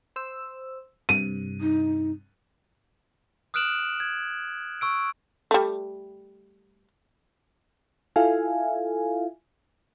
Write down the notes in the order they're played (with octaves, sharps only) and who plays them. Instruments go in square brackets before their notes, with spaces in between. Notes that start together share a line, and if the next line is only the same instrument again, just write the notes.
[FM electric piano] C5 E6
[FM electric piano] G2 C3 [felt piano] D#7
[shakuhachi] D#4
[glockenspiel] D#6 F6 F#6 D7 E7 F#7
G#6
C#6 E6 D7
[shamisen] G3 A3
[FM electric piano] E4 F4 A4 E5 F5 G#5